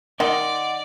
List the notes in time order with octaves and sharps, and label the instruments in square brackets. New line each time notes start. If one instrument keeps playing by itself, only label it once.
[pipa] D#3 [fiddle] D5 [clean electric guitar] D#5 F#5 C6